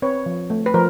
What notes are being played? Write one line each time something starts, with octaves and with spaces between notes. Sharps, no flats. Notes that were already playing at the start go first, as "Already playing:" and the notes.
C4 B4 C#5
F3
A3
B4
F3 A#4 C5